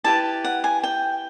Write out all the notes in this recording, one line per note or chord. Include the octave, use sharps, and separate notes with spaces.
E4 G4 B4 A5
F#5
G#5
G5